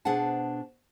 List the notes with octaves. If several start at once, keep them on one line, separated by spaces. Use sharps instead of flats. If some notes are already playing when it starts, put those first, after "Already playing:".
B2 D4 G#4 C5 F#5 A5